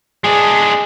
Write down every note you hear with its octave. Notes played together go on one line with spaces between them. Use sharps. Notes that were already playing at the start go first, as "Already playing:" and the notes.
G#3 D4 G#4